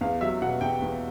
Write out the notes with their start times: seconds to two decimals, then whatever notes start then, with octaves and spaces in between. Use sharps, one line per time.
0.01 E2 F5
0.21 F#3 E5
0.42 B2 F#5
0.61 E2 G5
0.82 E2